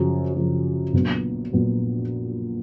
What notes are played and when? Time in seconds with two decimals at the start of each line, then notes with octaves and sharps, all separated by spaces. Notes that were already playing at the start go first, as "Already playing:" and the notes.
Already playing: F#2 C#3 F3
0.34 F#2 C#3 F3
0.93 A#1 A#2 F#3 B3
1.53 A#2 F#3 B3